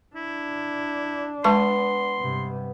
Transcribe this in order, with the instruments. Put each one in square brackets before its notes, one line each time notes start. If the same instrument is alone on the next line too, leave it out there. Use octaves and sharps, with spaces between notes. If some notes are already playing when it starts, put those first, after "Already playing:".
[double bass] D4 [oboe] E4
[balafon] G#3 A5 C#6 [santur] B3 [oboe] C6
[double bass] G2 C3